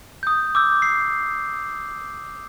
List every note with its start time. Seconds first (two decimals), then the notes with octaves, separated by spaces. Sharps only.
0.23 D#6 G6
0.55 D6 E6 G6
0.82 C7